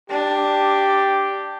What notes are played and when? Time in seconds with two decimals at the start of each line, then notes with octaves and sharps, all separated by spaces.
0.10 D4 G4